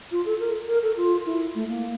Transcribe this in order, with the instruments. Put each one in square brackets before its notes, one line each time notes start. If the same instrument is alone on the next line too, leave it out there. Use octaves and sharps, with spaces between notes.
[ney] F4
A4
A#4
A#4
A4
F4
E4
A3
A#3